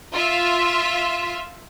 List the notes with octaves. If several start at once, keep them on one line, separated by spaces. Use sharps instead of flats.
F4 E5